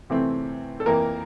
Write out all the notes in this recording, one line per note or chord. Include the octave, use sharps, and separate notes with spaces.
C3 E3 A3 C4
A4
F2 E3 A#3 A#4